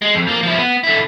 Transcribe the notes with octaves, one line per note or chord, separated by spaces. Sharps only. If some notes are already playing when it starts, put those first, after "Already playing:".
G#3
F2
F3 A#3
F3 E4
B3
D3 E4